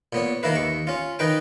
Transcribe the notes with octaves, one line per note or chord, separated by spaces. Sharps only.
A#2 B3 C#5
D#3 A#3 E4 B4
D#2 C#6
C#4 F4
D#3 D#4 B4 G5